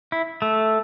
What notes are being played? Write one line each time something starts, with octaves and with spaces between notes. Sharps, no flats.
E4
A3